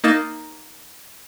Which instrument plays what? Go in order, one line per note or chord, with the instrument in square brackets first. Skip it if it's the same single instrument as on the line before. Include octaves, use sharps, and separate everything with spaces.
[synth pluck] A#3 D#4 A6 E7